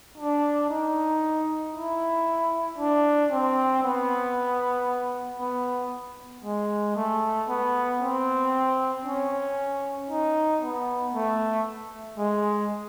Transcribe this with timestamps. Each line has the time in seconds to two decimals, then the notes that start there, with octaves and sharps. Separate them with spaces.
0.18 D4
0.69 D#4
1.74 E4
2.78 D4
3.31 C4
3.83 B3
5.40 B3
6.44 G#3
6.96 A3
7.48 B3
8.01 C4
9.05 C#4
10.09 D#4
10.62 B3
11.14 A3
12.18 G#3